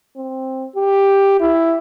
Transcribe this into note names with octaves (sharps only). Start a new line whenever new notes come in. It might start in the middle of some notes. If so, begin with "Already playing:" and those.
C4
G4
E4